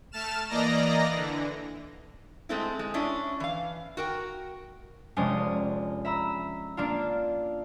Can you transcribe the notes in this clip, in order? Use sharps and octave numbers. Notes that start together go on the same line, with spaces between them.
A3 A5 F6 E7
E3 A#3 D5 D#5 A#5 A#6
D3 E3
G#3 A3 C4 E4
G#3
C#4 D4 E4
E3 F5
F#4 A#4 G5
F1 G#3 C#4 D4 C5 D#6
E5 A#5 B5 E6
A#3 D4 F4